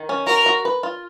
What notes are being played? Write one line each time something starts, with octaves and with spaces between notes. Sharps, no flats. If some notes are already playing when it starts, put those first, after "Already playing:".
Already playing: D#3
C#4
F#4 A#4
F#4
B4
F4